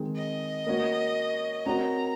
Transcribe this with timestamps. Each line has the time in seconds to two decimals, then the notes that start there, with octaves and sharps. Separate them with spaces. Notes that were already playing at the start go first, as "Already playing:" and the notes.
Already playing: D#3 G#3 C4
0.16 D#5
0.66 A#3 C#4 F#4 C#5
1.66 C4 F#4 A#4 C#5 A#5